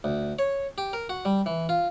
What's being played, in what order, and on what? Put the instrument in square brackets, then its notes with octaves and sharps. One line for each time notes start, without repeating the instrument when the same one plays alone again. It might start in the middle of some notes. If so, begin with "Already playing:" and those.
[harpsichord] D2
C#5
G4
A#4
F#4
G3
E3
F4